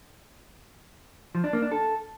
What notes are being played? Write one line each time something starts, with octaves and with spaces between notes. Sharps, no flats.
F3
D4
A#3
D4
A4